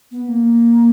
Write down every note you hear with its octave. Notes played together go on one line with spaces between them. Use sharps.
B3
A#3